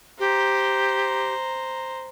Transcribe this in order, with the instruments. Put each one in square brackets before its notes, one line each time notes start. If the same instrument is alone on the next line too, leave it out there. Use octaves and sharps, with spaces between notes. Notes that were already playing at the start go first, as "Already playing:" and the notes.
[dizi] G4 [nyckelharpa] C5 A#5